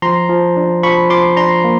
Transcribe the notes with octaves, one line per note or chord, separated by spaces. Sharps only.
F3 A#5 C6
F3
D4
F3 B5 C#6
F3 C6 D6
D4 A#5 C6
A#3